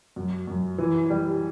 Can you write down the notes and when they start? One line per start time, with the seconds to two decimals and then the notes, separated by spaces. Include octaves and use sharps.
0.16 F#2
0.47 F#2
0.78 E3
1.10 G3